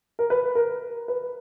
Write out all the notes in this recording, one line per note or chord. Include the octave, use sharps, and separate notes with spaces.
A#4
B4
A#4
B4